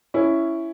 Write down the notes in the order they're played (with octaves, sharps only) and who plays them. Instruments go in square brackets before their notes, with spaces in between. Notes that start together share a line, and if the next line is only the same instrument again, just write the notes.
[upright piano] C#4 E4